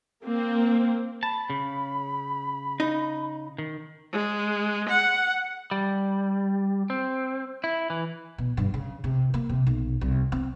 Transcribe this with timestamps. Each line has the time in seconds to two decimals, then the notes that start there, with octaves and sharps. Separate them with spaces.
0.24 A#3 C4
1.23 A5 B5
1.50 C#3
2.80 D#4
3.58 D#3
4.12 G#3
4.89 F#5
5.71 G3
6.90 C4
7.64 E4
7.90 E3
8.38 B2
8.57 G2
8.74 C#3
9.04 C3
9.34 A#3
9.49 C3
9.66 B1
10.01 C2
10.32 C4